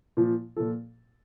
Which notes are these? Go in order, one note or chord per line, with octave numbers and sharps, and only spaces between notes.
A#2 F3
A#2 F3 A4